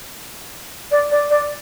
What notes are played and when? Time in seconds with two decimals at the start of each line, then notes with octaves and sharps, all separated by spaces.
0.91 D5
1.11 D5
1.30 D5